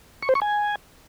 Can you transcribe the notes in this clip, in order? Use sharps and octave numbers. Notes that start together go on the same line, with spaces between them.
C#6
C5
C#6
G#5